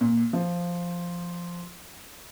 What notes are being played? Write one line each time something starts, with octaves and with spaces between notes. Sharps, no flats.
A#2
F3